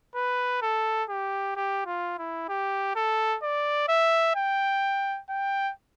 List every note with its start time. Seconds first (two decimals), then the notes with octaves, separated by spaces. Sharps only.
0.15 B4
0.62 A4
1.09 G4
1.56 G4
1.86 F4
2.18 E4
2.49 G4
2.96 A4
3.43 D5
3.89 E5
4.36 G5
5.30 G5